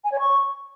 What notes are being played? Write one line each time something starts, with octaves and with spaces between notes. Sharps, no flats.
G#5
C#5
C#6